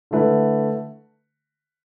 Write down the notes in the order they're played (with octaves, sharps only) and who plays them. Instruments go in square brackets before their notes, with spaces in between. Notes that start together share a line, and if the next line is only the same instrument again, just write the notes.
[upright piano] D3 A3 E4 B4